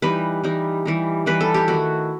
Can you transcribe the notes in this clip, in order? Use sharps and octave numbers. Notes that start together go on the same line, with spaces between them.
E3 G3 D#4 B4
E3 G3 D#4
E3 G3 D#4
E3 G3 D#4 B4
A4
G4
D#3 A3 E4 F#4